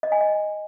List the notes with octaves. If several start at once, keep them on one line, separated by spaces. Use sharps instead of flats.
D#5
G#5
D#5